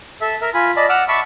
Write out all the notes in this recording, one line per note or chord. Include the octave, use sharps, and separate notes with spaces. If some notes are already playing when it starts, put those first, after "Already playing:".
A4 E5
A#4 E5
F4 G#5 B5
D5 D#5 A5 B5
F#5 D6 E6 F6
E5 A5 B5 C#6 D6 E6